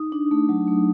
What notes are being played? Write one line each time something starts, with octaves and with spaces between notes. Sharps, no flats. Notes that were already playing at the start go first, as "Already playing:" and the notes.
Already playing: D#4 D#6
D4
A3
F#3
A3